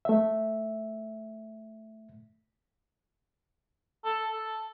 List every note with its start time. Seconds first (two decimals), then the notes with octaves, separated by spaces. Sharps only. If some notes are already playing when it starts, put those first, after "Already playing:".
0.05 A3 E5
4.04 A4
4.32 A4